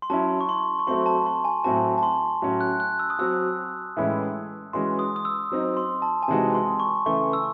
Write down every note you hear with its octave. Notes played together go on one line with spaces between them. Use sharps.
C6
F#3 C#4 E4 A5
C#6
C6
C#6
F#3 A3 C4 F#4 C6
A5
C6
G#5
A2 F#3 C4 F#4 A5
A5
C6
A2 F#3 C#4 F#4
F#6
F#6
E6
D#6
F#3 C4 F#4 E6
A2 E3 G#3 C#4 E4
E3 G#3 C#4 F#4 C6
D#6
D#6
E6
F#3 C4 D#4
C6
A5
G#5
C3 E3 G#3 D#4 F#4 A5
C6
C#6
C#3 E3 A3 C#6
E6